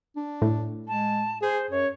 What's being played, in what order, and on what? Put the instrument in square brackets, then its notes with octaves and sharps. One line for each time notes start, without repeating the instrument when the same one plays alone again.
[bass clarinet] D4
[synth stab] A2
[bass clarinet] G#3 [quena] A5
[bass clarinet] G#4 [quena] C5
[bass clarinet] F#2 [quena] C#5